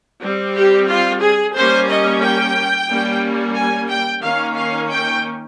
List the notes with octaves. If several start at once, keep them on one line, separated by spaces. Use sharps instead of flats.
G3 C4
G4
F4
G#4
G3 A#3 C#4 C5
D#5
G5
G3 A#3 C#4
G#5
G5
D#3 A#3 C#4 F5
F5
G5